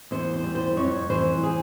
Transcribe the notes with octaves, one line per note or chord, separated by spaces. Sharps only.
E2 C5
C5
G3
C5
F2 C#5
E3 C5
G3 G#4